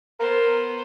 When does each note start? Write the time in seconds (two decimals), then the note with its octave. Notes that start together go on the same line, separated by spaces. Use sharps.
0.20 B3 A#4 C5